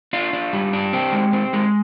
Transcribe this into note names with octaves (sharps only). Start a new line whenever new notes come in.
D4 F4
D4
G3
D4
C4 G4
G#3
C4
G#3